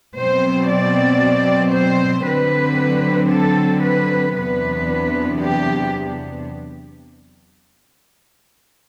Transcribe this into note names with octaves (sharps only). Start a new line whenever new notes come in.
B2 F#3 C4 C5
D5
C5
D3 F#3 C4 B4
A4
B4
E2 C3 F#3 B3 D4 B4
G4